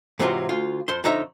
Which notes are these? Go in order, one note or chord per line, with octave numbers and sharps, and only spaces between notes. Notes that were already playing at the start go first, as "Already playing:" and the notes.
G#2 C3 E3 F#3 C4 F4
D2 F4 F5
F2 C5 C6
F2 D3 D#4 C#5 E5 A#5